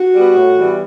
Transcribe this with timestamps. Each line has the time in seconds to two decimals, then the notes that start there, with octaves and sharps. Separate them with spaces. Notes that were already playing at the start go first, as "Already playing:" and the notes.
Already playing: F#4
0.14 G3 B3
0.35 A2
0.57 E3 G3 B3